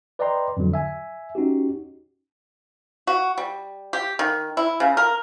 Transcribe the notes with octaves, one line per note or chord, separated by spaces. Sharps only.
B4 D5 D#5 G5 A#5 C6
F2 G#2 D3 F#3
E5 G#5
C#4 D#4 F#4 G4
F#4
G3
G4
D#3
E4
C#3
A#4